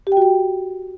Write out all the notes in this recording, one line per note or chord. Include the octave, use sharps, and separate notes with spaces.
G4
G5
F#4
G5